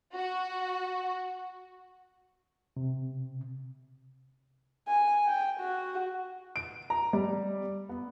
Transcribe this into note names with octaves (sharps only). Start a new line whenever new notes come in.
F#4
C3
G#5
G5
F#4
D7
A#5
G3
B3